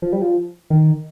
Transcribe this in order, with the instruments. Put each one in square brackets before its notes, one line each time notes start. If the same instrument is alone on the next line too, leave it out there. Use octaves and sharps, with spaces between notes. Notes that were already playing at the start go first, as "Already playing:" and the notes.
[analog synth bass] F3
G3
F3
D#3